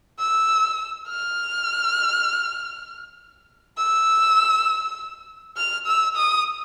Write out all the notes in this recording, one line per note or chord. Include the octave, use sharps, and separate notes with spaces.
E6
F6
E6
F6
E6
D#6